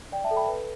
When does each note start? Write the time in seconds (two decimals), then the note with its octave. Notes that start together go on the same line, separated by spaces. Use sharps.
0.12 D5 G5
0.24 E5 A5
0.31 A4
0.36 G5 B5
0.48 B4